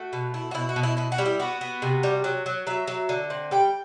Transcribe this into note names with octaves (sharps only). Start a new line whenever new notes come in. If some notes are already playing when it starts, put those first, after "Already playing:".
Already playing: A3 F#4
B2
E4
F#4
B2 E4
F#4
B2
E4
B2 E4
F#4
G3
E4
B3 F#4
B3
C3
G3
F#3
F#3
F#3 E5
F#3
D3
C4
G3 G5